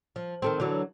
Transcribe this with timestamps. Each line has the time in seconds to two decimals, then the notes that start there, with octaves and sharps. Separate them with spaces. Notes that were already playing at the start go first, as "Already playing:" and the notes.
0.16 F3
0.42 D#3 A3 C4
0.60 D3 E3 F#3